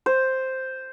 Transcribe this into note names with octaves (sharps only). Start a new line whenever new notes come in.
C5